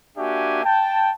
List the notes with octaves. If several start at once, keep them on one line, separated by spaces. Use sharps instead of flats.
A#3 D4 F#4 G4 E5 G#5
G5 A5